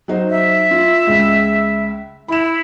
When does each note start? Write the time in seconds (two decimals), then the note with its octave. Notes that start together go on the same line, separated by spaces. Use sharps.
0.08 F#3 D#4 C5
0.30 E5
0.71 F4
1.07 C#2 G#3
2.28 E4 B5 E7